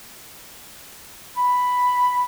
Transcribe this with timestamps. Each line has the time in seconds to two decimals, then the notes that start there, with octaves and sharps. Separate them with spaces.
1.37 B5